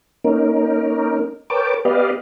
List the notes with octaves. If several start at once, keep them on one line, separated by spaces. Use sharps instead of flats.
A#3 C#4 D#4 A#4
A#4 B4 C#5 G5 A5 D6
B3 G4 B4 D5 D#5 F5